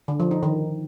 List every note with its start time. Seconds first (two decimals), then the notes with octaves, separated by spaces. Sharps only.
0.08 D3
0.20 F3
0.31 D#4
0.43 D#3